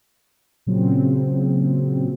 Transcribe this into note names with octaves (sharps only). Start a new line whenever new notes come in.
A#2 C#3 F#3 C4